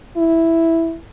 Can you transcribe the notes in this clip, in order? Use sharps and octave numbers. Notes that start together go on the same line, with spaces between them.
E4